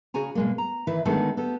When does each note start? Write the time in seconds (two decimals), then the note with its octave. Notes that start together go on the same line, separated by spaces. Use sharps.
0.14 C#3 F#4 G#4 G#5 A#5
0.35 B2 G#3 A#3
0.58 A#5
0.87 D#3 E3 E4 B4
1.05 D2 D#3 G#3 B3 G#4 A4
1.37 B3 G4 A4